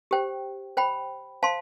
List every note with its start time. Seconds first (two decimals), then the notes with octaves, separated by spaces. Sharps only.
0.11 G4 C5 G5
0.77 C5 G5 B5
1.43 C5 F5 A5 C6